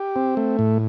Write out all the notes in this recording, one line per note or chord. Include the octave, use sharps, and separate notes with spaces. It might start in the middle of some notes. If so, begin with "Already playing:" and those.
Already playing: G4
C4
A3
A2